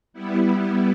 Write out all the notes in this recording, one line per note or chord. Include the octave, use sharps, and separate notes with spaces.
G3 B3 E4